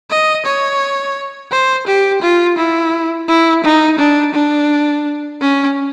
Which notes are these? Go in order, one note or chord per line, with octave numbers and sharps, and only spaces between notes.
D#5
C#5
C5
G4
F4
E4
E4
D#4
D4
D4
C#4